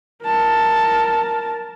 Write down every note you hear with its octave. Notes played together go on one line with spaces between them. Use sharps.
A#4 A5